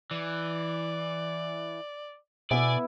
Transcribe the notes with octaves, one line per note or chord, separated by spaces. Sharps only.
E3 D5
B2 B3 E4 D5 G#5